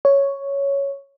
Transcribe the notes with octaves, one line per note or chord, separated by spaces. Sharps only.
C#5